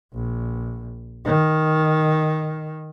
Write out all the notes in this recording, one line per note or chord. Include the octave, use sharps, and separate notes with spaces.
A#1
D#3